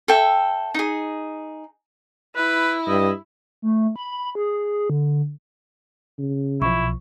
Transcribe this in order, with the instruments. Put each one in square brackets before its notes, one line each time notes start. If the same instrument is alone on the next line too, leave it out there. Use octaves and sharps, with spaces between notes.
[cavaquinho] A4 E5 G5
D#4 G#4
[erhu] E4 [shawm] B4
[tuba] G2 [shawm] D#5
[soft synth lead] A3
B5
G#4
D3
[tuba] C#3
[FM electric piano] B1 F3 [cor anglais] E4 [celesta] C#6